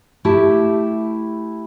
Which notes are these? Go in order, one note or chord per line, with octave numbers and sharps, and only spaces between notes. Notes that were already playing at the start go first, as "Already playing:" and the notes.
A3 E4 G4 A5